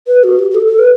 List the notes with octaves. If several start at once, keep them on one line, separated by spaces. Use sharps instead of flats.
B4
F#4
G4
G4
A4
A4
B4